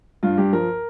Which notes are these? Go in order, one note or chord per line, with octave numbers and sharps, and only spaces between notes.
G2 F4
G2 G4
F3 A#4